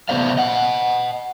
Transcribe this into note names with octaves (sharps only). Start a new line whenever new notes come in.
C3 A3 B3 C5 D5 F5
D#5 F#5